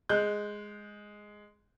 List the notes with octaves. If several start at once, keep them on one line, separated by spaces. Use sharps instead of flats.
G#3 F#6 G6